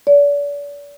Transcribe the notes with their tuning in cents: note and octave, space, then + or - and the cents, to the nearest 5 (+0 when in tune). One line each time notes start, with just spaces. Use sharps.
D5 -40